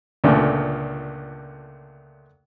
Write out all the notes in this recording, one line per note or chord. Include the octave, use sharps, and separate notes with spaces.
C#2 A#2 D3 A3